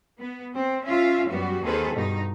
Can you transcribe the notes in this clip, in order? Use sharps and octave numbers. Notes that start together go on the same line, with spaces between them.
B3
C4
C#4 F4 E5 F5
F#2 G3 B3 F#4
D#2 D#3 C4 G#4 A4 B4
G2 B2 D#4